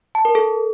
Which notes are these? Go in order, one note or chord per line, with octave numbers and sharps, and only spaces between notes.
A5
A#4
A4